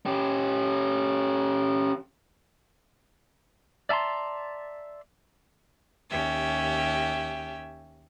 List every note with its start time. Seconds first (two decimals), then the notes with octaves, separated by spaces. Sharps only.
0.06 C#4 G4
3.89 D5 E5 A5 A#5 C6
6.09 D#2 C#4 G4 E5